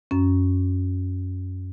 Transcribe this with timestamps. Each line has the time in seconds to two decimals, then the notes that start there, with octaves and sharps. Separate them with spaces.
0.11 F#2 C#4